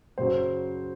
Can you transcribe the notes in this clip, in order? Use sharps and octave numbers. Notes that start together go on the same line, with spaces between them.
F#2 C#3 F#3 C5